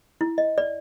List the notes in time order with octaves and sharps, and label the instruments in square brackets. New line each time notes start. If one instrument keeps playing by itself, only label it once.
[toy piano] E4
D#5
D5